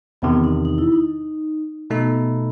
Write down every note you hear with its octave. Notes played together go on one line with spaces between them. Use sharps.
E2 C3 D#3 B3
D#4
D#4
E4
D#4
B2 A3 B3 D#4 A4